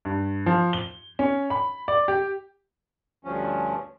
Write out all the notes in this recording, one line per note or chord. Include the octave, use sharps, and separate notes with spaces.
G2
F3
G7
C#4
B5
D5
G4
D2 G2 F3 C#4